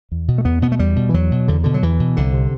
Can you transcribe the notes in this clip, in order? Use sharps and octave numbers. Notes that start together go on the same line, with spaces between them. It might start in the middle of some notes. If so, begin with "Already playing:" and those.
E2
B2
A3
E2 B3
B2 B3
A3
E2 G3
B2
E3
E2 F#3
B2
E2 D3
B2 D3
F#3
E2 E3
B2
C2 D3
C3